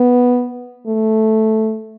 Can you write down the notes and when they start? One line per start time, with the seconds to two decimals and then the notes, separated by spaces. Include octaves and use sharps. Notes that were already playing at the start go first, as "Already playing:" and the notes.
Already playing: B3
0.87 A3